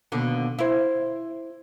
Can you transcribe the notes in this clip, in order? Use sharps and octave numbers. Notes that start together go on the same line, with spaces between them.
D#2 B2 D3
E4 C5